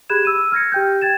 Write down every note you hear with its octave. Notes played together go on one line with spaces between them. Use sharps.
G4 G#4 B5 F#6 G#6 E7
E6 D#7
F6 G#6 A#6 C#7
G4 G5 G6
G5 G#6 A6 E7